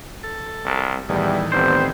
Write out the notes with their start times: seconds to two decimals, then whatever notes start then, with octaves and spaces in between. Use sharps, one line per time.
0.23 A4
0.65 C2
1.09 E2 A2 D#3 E3 G3
1.52 F1 G3 B3 C4 C5